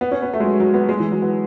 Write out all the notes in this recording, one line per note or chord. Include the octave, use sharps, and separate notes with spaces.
B3
C#4
B3
A3
G#3
F#3
F#3
B3
G#3
E3
F#3
B3